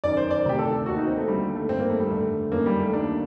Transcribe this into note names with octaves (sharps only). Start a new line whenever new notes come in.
F#2 D#3 D5
C5
D5
D2 C3 D#3 G4
A4
D#2 D#3 F#4
D#4
C4
A3
D#2 D3 G3
A3
G2 D#3 C4
A#3
A3
G3
G2 D3 A3
F#2 D#3 A#3
G3
A3
D#2 D#3 D4